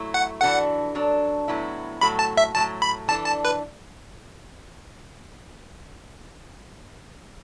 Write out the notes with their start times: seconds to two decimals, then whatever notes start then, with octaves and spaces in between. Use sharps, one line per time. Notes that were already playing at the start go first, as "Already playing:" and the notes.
Already playing: F#3 A3 E4
0.14 F#5
0.41 E3 D4 F#4 A4 F#5
0.95 F#3 D4 A4
1.48 A2 F#3 B3 E4
2.01 A2 F#3 A3 F#4 A4 B5
2.19 A5
2.37 E5
2.55 A2 F#3 A3 A5
2.82 B5
3.08 E3 D4 A4 A5
3.26 A5
3.45 B4